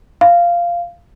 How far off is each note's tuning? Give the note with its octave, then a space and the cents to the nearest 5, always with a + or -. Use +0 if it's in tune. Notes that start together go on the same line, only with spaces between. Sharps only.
F5 -10